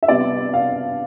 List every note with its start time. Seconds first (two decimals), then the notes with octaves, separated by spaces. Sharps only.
0.03 E5
0.08 C3 G3 B3 D5
0.54 F5